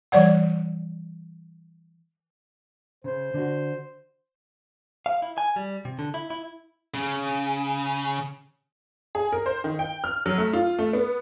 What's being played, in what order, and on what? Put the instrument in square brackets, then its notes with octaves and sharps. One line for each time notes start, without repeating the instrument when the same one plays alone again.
[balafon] E3 G3 C#5 D5 F#5
[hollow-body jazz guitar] C#3 [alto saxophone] C5
[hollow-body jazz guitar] D3 F#4
[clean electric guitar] F5
E4
G#5
G3
C3
D3
E4
E4
[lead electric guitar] C#3
[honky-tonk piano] G#4
A#4
C5
D#3
G5
F6
F#3
A3
F4
A3
B3